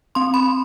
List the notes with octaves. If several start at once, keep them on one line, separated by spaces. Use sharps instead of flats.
C4 C6
B5